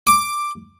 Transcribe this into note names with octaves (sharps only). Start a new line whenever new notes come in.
D6